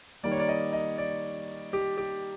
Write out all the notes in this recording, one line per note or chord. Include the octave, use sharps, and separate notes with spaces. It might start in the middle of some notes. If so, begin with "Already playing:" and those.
D#3 G3 A#3 D5
C#5
D5
D#5
D#5
D5
G4
G4